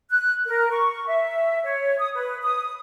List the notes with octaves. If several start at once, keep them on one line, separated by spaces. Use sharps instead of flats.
F#6
A#4
C#6
E5
C#5
D#6
B4
D#6